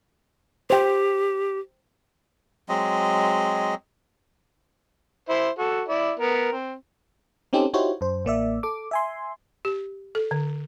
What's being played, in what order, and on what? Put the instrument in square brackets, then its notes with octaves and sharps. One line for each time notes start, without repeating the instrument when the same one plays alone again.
[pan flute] G4 [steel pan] C5 G5
[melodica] F#3 G#3 C4 D#5
[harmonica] E4 C5
F#4 A4
E4 D5
B3 A#4
C4
[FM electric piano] C4 C#4 D#4 G4 A4 C5
D#4 E4 F#4 G4 C5 C#5
F#2 C5
A1 A#3 D5 E5
A4 D6
E5 G#5 C6
[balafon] G4
A4
D3